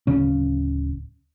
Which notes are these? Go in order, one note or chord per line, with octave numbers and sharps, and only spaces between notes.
D1 C#3 C#4